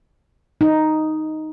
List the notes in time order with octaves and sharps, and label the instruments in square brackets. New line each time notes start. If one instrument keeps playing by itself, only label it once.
[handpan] D#4